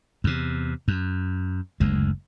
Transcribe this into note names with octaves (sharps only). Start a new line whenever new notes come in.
E2 C3
F#2
F#1 D2 G#3